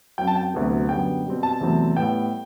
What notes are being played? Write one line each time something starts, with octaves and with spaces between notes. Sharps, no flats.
F#2 F#3 C4 G5
A5
G5
D2 C3 F#3 B3
F#2 D3 G3 B3 G5
B2 G3 C4
A5
E2 C3 F#3 A3 C4
A2 G3 B3 G5